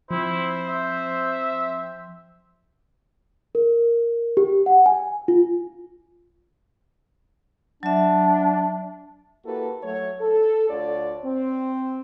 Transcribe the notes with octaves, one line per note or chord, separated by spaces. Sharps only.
F3 C4 E4 C5
E5
A#4
G4
F#5
G#5
F4
F#3 D4 E5
A#3 E4 F#4 G4 A4 B4
F#3 A3 C#5
A4
D2 D3 F4 C#5 D5
C4